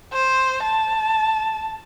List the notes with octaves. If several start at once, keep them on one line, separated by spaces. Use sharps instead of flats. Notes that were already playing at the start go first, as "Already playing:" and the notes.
C5
A5